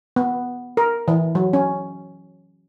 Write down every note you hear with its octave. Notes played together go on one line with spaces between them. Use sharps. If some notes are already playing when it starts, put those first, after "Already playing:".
B3
A#4
E3
F#3
C#4